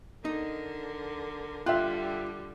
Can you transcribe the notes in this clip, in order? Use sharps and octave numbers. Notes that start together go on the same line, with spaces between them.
D3 D#4 A#4
D3 G3 F4 E5 G5 F#6